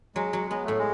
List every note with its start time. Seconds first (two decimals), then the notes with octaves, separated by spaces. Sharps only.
0.15 F#3 G#3
0.33 F#3
0.50 G#3 B3
0.64 A2 A3
0.78 G#3